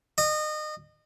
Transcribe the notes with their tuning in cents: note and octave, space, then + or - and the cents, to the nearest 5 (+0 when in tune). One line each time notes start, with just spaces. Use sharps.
D#5 -30